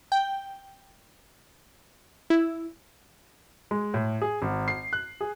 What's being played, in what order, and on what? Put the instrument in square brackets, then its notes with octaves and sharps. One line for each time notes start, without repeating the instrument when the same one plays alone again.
[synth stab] G5
E4
[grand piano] G#3
A2
G#4
G#1
C7
F#6
G#4